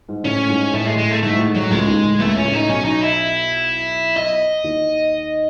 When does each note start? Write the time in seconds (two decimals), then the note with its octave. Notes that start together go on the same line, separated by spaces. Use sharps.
0.09 G#2
0.24 A2 C#4
0.49 G#2
0.73 A2 A3
0.86 G#3
0.98 G#3
1.10 A3
1.23 G#2 A3
1.33 A2
1.39 G#2
1.55 A2 F#3
1.71 C#2 C#3 G#3
1.87 D#2 D#3
2.03 A2
2.20 C#2 C#3 A3
2.37 C#4
2.45 A2
2.53 D#4
2.69 B1 B2 C#4
2.85 D#4
3.02 E4
4.16 D#5
4.64 D#2 D#3